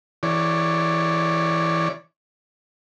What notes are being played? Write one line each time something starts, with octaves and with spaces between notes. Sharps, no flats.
E3 C#5 D5